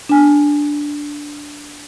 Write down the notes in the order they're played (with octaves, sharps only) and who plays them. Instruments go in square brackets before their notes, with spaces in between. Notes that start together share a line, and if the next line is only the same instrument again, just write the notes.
[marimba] D4 G#5